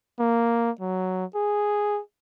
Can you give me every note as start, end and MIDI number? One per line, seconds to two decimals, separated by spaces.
0.19 0.71 58
0.81 1.25 54
1.35 2.00 68